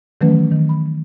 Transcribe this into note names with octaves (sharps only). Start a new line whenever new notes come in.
D#3 E3 F#3 A3 C#4 B4
D#3
B5